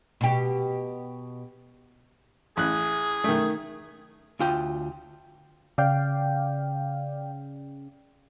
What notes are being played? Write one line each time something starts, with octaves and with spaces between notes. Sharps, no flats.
B2 G4
A1 G#4 F#6
D#3 A3
D2 F4 G5
C#3 D5 F5 G5